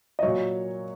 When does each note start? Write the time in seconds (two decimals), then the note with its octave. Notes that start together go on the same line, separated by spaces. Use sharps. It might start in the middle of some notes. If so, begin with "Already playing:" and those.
0.19 D#5
0.23 A#2 F#3 C#5